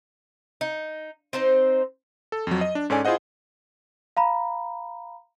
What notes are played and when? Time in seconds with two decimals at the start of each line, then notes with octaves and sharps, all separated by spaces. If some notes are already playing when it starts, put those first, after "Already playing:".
0.61 D#4
1.33 C4 D#4 C5
2.32 A4
2.47 F2 F#3
2.61 D#5
2.75 D4
2.90 G#2 C#4 A4 D5 G#5
3.05 E4 F4 G#4 C5 D#5 F#5
4.17 F5 A#5 B5